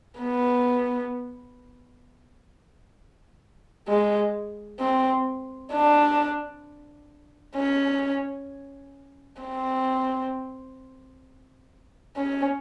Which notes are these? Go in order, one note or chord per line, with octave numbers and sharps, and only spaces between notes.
B3
G#3
C4
D4
C#4
C4
C#4